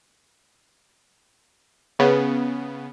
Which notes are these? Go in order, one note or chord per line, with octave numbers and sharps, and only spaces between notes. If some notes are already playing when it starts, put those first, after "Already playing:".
C#3 B3